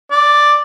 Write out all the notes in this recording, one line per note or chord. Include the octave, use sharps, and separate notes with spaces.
D5